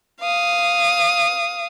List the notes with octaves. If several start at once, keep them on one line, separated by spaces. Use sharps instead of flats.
F5 D#6